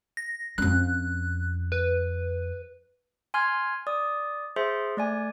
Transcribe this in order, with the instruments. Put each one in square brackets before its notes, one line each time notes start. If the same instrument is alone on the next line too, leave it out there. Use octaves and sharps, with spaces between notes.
[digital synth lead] A#6
[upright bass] F2 C#4 [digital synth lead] F#6
[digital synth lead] B4
[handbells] G#5 C6 F6 G#6
D5 D#6
G#4 C5 E5 C6
A3 D5 G#5